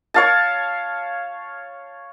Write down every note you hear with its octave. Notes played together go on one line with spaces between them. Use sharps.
C#5 F5 A5